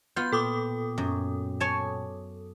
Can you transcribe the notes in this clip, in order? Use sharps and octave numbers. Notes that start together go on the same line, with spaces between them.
B3 F4 G6
A#2 A4 G5 D6 D#6
F#2
C#5 G#5 A5